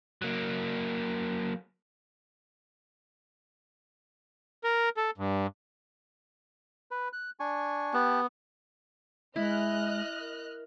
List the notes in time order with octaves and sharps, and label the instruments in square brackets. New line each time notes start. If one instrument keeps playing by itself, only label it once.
[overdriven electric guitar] F#3 A#3
[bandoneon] A#4
A4
G2
[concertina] B4
F#6
D4 G#5 C#6
[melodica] B3 [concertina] G4 A5 F#6
[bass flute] G#3 [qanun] E4 [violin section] D#5 F6 F#6
[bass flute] A#4